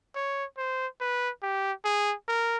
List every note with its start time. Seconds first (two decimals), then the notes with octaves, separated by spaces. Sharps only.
0.15 C#5
0.57 C5
1.00 B4
1.43 G4
1.85 G#4
2.28 A#4